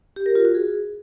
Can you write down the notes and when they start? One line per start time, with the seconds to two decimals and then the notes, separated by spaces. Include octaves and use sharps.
0.16 G4
0.26 A#4
0.35 F4
0.45 F#4
0.55 G#4